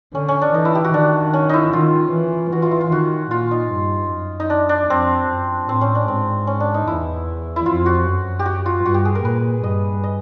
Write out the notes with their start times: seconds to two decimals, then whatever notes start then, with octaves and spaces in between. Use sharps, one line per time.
0.15 D3 C#4
0.29 C#4
0.42 D4
0.54 E3 D#4
0.65 E4
0.75 G4
0.84 F#4
0.94 D#3 D4
1.33 C#4
1.49 D#4 E4
1.73 D#3 F4
2.13 E3
2.52 E3 F#4
2.62 F4
2.71 E4
2.81 F4
2.92 D#3 F#4
3.31 A#2 F4
3.51 D#4
3.71 G2
4.10 F#2
4.40 D#4
4.50 D4
4.69 D4
4.89 F2 C4
5.29 F#2
5.68 A2 C4
5.81 C#4
5.95 D4
6.08 G#2 C4
6.47 C#4
6.60 D4
6.74 D#4
6.87 E2 E4
7.56 E4
7.66 F2 F4
7.86 F#4
8.06 F#2
8.39 G4
8.46 F#4
8.66 F4
8.85 G2 F#4
8.94 G4
9.05 G#4
9.15 A#4
9.24 A#2 B4
9.64 G2 D#5
10.04 D#5